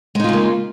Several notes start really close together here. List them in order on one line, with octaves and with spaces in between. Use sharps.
G#3 D#4 F4 C#3 A#3